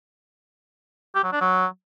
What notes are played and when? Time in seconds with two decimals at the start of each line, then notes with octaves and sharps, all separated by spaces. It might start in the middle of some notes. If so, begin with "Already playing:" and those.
1.15 G4
1.24 F#3
1.32 D4
1.41 F#3